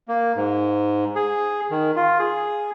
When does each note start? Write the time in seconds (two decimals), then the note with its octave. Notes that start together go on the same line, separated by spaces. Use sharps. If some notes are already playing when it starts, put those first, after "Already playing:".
0.08 A#3
0.36 G#2
1.16 G#4
1.71 D#3
1.96 F4
2.19 G#4